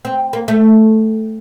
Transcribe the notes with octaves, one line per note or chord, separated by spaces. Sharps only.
C4
A#3
A3